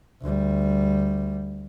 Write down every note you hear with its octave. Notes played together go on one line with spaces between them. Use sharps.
D2 G3